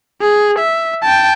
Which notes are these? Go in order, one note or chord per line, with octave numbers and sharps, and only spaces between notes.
G#4
E5
G5 A5